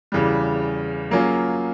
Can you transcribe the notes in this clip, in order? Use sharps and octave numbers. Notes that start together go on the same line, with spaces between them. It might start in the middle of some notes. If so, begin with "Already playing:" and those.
E2 C#3 E3 G3
F#3 A#3 C#4 F4 G#4